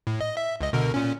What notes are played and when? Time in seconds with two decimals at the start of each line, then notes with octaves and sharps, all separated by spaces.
0.07 A2
0.21 D#5
0.37 E5
0.61 C#2 D#5
0.73 B2 D3 A#4
0.94 A#2 C#4